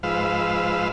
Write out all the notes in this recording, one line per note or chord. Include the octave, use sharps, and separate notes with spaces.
G#2 F3 B4 F5 E6